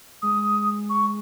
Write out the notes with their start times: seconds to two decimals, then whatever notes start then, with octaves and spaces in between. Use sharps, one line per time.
0.22 G#3 D#6
0.90 C#6